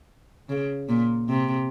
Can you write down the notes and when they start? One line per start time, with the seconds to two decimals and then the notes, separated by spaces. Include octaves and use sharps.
0.49 C#3
0.89 A#2
1.29 C3